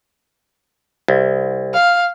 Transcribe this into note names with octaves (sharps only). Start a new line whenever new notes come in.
C2
F5